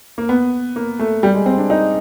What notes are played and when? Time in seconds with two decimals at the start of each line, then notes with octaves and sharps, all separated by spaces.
0.18 A#3
0.29 B3
0.76 A#3
0.99 A3
1.23 G3
1.34 G#3
1.46 C4
1.58 D4
1.70 D#4